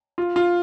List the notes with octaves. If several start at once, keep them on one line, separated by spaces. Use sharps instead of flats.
F4
F4